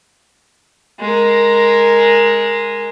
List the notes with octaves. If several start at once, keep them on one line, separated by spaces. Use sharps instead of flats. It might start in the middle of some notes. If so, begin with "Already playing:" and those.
G#3 A#4